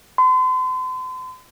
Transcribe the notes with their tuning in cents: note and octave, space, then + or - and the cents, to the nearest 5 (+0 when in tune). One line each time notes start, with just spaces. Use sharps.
C6 -40